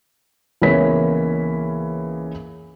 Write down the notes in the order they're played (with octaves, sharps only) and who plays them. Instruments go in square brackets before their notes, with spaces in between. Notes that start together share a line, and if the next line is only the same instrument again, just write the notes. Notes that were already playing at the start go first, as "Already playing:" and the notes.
[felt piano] C#2 E3 A#3 B3 C#5 B6